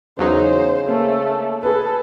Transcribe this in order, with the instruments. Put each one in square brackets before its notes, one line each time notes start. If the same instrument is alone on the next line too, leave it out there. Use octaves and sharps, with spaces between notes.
[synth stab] E2 F#3 D#4 [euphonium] C#3 [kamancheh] C5
[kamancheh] A3 [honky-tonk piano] A#3
[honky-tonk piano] G#4 B4 [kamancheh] A4